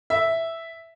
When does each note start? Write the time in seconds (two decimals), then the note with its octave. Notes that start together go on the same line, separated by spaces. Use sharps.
0.10 E5